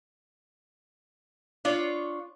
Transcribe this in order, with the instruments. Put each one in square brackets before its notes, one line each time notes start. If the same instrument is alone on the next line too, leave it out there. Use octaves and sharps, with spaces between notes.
[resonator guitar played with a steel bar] D4 F4 C#5